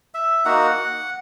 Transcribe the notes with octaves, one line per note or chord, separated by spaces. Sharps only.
E5
A#3 D#4 F#4 F#5